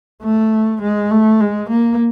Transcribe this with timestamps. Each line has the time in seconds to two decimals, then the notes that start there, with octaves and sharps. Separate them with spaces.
0.23 A3
0.82 G#3
1.11 A3
1.40 G#3
1.70 A#3